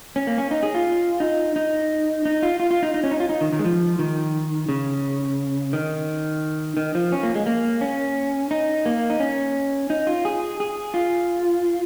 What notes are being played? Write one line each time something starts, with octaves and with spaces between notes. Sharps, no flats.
C#4
A#3
C#4
D#4
G#4
F4
D#4
D#4
D#4
F4
F4
F4
D#4
D#4
C#4
D#4
F4
D#4
D#3
D#3
G#3
F3
D#3
C#3
D#3
D#3
F3
C#4
A#3
G#3
A#3
C#4
D#4
A#3
D#4
C#4
D#4
F4
G#4
G#4
F4